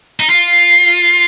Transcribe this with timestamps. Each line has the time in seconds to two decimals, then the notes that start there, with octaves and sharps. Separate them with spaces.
0.20 D#4
0.30 F4